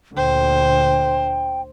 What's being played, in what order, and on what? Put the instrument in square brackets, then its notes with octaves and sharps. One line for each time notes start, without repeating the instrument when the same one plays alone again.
[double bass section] D2 A#2 D3 [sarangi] C5 [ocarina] G5